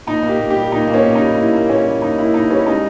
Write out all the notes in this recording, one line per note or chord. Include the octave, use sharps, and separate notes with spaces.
A#2 D#4
A#3
G4
A#2
G4
G3
A#2 D#4
A#3
C#4
A#2
D#4
G3
A#2 E4
A#3
A#2 C#4
G3
A#2 D#4
A#3 E4
A#2 D#4
G3 C#4
G#3 D#4